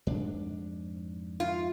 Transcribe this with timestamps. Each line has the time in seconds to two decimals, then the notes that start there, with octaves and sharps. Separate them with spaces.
0.07 F2 G#2 D4
1.40 F4